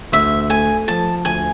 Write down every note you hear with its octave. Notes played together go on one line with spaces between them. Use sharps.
D2 E5
A3 G#5
F3 A5
D2 G#5